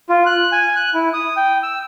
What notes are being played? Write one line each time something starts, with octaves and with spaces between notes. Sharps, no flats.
F4
F#6
G#5
F#6
E4
D#6
G5
E6